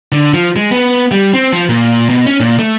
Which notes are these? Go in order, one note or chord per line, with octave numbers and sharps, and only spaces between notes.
D3
F3
G#3
B3
G3
C4
F3
A#2
B2
C#4
A#2
A3